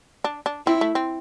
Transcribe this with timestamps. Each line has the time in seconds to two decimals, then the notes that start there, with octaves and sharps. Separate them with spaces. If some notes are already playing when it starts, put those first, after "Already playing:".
0.24 D4
0.46 D4
0.66 C4 E4
0.81 A3
0.95 C4